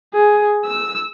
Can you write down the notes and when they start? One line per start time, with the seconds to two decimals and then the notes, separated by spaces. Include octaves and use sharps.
0.14 G#4
0.65 E6